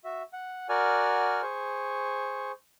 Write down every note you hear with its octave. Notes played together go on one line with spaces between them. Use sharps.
F#4 E5
F#5
F#4 A#4 D5 F#5 G#5 F6
G#4 C5 C#6